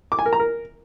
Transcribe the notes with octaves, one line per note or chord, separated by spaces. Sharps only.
D6
G#5
A#4
A#5
A#4